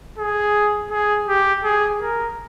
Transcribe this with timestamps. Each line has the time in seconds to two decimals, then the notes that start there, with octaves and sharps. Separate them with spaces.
0.18 G#4
0.91 G#4
1.28 G4
1.64 G#4
2.01 A#4